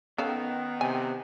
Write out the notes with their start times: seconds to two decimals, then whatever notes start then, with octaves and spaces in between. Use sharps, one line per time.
0.18 D#3 B3 C#4 A4 F5
0.81 C3 G#5